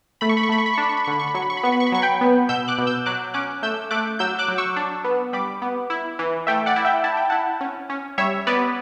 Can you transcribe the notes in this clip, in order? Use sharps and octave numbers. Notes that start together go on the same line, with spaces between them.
A3 B5
C#6
B5
C#6
A3 B5
C#6
B5
C#6
D4 B5
C#6
B5
C#6
D3 B5
C#6
B5
F#3 C#6
B5
C#6
B5
B3 C#6
B5
C#6
B5
F#3 C#6
G5 B5
B3
B2 E6 G6
D6 F#6
B2
E6 G6
F#3 D6 F#6
C#4 D6 F#6
A3 E6 G6
A3 D6 F#6
F#3 E6 G6
D6 F#6
F#3
C#6 E6
D4
B3
G3 B5 D6
B3
E4
E3
A3 E5 G5
D5 F#5
E4
E5 G5
E4 A5
G5
E4 F#5 A5
C#4
C#4
G3 C#5 E5
B3 B4 D5